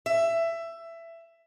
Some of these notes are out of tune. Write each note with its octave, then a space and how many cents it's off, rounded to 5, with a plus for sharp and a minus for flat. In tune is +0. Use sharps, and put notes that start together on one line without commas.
E5 +15